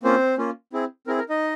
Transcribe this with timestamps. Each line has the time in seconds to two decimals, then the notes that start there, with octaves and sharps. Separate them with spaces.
0.03 A#3 C4 C#4 F4 C5
0.38 A#3 C#4 F4
0.73 C4 E4 G#4
1.07 C4 E4 G#4 A#4
1.18 A#4
1.29 D#4 D#5